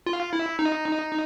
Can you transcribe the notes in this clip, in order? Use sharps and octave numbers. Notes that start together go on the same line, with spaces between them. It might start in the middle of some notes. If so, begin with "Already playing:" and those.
F4
E4
D#4